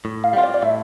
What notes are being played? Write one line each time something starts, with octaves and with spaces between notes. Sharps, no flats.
A2
F5
G3 C4 F4
D5
D5
A2 E5